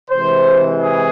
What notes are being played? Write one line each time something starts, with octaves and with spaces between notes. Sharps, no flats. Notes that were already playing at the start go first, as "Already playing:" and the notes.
C3 E3 G#3 C5
G#4